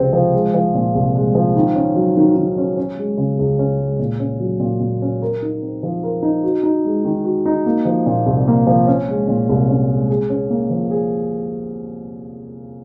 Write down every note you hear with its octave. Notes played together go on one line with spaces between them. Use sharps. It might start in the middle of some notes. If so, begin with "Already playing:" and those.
Already playing: C#2 C3 F3 C4
F3
G#3
F3
A#2
C2
G#3
F3
D#3
C#4
F#3
D#3
D#3
C#4
C#4
G#3
C#3
C#2
C#4
G#3
A#2
C#4
F#3
A#2
A#2
C#4
A#4
D#4
C4
F3
A#4
D#4
F#4
D#4
G#3
D#3
F#4
D#4
A#3
F3
A#2
C2
A#3
F3
C#4
G#3
A#2
C2
C#4
G#3
G#4
C#4
A#3
F3
G#4